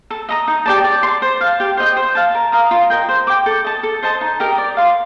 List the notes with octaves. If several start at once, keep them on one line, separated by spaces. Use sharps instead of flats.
A4
D#5 A#5 D#6
D#4
G4 D5 A5
D5
C6
A5
C5
F5 A5
G4
C5 D#5 G5
C5
F5 A5
A#4
F5 A#5 D#6
F4
A#4 D#5 G5
C5
G5 D6
A4
D#5 A5
A4
C5 D#5 A5
D#4
G4 A#4 D#5
D5
F5 C6